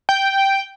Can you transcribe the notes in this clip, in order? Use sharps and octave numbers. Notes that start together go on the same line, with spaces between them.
G5